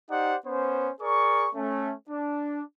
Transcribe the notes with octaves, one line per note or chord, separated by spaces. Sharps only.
D#4 G4 C5 D5 F#5
B3 C#4 C5
G#4 A#4 D5 C#6
A3 C#4
D4